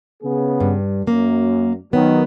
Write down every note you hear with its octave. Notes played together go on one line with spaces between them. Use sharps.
C#3 B3 G#4
G2
F#2 A#3
D#3 F#3 B3